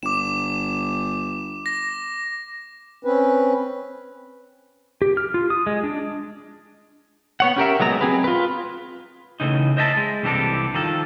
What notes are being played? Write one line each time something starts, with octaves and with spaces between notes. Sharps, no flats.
G1 D6 E7
A#6
C4 C#4 B4
G4
F6
F4
D#6
G#3
D4
B3 C#5 F#5
C#4 G4 A#4 E5
F#3 G#3 B3 A#5
C4 G#4 B4
F4 B4
A2 C#3 E3 D#4
C5 D#5 E5 G#5 A5
G#3
C2 E3 C4 D4 G4 A4
D#3 F3 A4